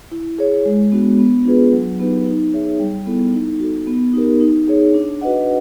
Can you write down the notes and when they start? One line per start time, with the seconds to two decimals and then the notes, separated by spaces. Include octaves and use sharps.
0.12 E4
0.39 G#4 C#5
0.66 G#3
0.92 B3 D4 F#4
1.19 B3
1.46 D4 F4 G#4 B4
1.73 F#3
1.99 B3 D#4 G4 B4
2.27 D#4
2.53 G#4 C#5 E5
2.80 G3
3.06 B3 E4 A4
3.34 D#4
3.60 F#4 A4
3.87 B3
4.13 D#4 G4 A#4
4.40 D#4
4.68 G#4 C#5
4.94 D4
5.21 F#4 B4 D#5 F#5